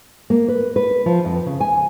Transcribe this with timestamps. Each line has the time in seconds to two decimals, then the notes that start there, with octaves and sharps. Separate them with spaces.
0.30 A#3
0.48 B4
0.76 B4
1.06 F3
1.25 F2
1.46 C#3
1.60 G#5